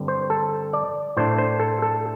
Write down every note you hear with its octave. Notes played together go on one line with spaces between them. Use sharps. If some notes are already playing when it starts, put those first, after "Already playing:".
Already playing: G2 D3 C4
C5
A4
D5
A2 A3 D4 C5
C5
A4
A4